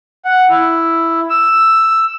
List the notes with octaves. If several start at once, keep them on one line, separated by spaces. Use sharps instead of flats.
F#5
E4
E6